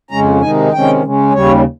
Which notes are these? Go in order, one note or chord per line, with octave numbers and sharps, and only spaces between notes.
F2 C#3 G#3 C#4 A#5
C3 D#3 G#3 D#4 G#5
C3 D#3 G#3 C#4 G5
C#3 G#3 C#4
D#2 C#3 G3 C#5